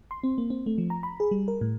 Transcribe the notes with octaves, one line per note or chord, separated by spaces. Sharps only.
C6
C4
A#3
C4
A3
F3
A#5
B5
G#4
G3
A#4
A2